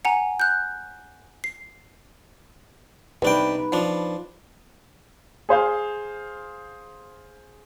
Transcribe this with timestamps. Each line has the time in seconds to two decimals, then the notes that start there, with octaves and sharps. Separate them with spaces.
0.05 F#5 G#5 A#5
0.40 F#6 G6
1.44 C7
3.22 C2 D4 D#4 B4 G5
3.72 F3 D4
5.49 G#4 C5 F5 G6